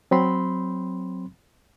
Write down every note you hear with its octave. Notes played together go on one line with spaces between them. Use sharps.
F#3 C4 B5 C6